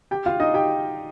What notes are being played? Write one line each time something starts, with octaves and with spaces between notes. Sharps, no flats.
G4 G5
F4 F5
D#4 D#5
G4 G5